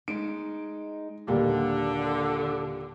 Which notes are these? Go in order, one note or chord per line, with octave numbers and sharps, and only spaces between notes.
G#3 D#4 D7
D#2 A#2 D3 G3